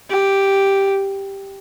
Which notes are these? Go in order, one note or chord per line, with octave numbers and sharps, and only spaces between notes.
G4